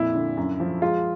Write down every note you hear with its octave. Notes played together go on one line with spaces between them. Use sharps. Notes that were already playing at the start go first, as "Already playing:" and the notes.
Already playing: F2 A#2 E4
D3
F#2
F3
G#3 F4